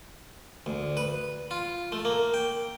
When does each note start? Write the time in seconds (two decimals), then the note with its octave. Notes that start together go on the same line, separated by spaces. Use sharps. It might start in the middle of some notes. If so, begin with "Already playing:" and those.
0.66 D2
0.97 B4
1.51 F4
1.92 A3
2.05 A#3
2.34 G5